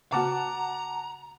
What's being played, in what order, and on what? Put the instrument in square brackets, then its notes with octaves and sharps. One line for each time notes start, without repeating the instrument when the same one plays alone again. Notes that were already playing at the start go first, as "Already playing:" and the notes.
[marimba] C#3 A#3 F#4 [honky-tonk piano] F#5 A5 D6 [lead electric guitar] A#5